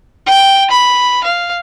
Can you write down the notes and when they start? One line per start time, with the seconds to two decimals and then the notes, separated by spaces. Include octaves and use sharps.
0.26 G5
0.70 B5
1.24 F5